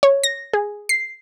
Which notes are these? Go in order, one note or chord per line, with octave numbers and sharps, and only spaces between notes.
C#5
A#6
G#4
C7